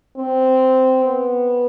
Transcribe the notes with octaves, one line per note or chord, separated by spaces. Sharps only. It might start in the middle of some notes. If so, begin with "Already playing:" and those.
C4
B3